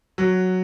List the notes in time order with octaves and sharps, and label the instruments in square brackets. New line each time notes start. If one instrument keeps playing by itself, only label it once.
[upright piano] F#3